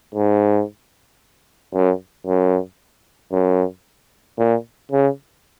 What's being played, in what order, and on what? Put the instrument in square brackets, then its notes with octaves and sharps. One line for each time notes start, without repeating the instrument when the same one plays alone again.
[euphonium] G#2
F#2
F#2
F#2
A#2
C#3